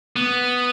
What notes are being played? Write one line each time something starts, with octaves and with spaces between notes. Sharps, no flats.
B3